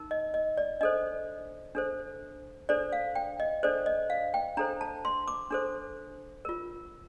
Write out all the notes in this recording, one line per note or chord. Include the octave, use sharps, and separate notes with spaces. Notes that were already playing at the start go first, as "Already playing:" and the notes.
Already playing: D#4 A#4
D#5
D#5
D5
D4 A4 C5 D#5
D4 A4 C5
D4 A4 C5 D5
F5
G5
D#5
D4 A4 C5 D5
D#5
F5
G5
D4 A4 C5 A#5
A5
C6
D6
D4 A4 C5
F4 A#4